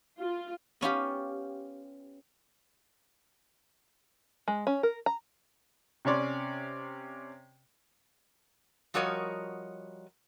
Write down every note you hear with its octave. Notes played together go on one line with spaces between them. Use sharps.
F4
B3 C#4 F4 G4
G#3
C#4
A#4
A#5
C3 C#4 C#5 D5 C6
F3 G3 F#4 A#4 C#5 D#5